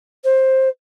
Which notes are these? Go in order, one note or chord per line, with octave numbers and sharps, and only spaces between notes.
C5